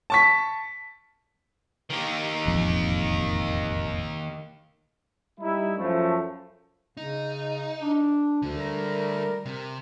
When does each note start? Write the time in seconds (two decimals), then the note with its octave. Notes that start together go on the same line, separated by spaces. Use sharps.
0.10 A5 C#6 B6
1.90 D#3 A#3
2.46 E1 A1 F2
5.40 G3 D#4 E4
5.76 F#2 F3 A3
6.97 C#3 D#4
7.82 D4
8.42 D2 D3 A3
8.57 G3 A#4
9.46 C3